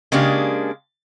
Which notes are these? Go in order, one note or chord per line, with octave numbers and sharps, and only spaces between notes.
C#3 G#3 A#3 D4 G4